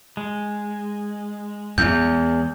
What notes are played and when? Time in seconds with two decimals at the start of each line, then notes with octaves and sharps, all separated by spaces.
0.17 G#3
1.78 E2 G6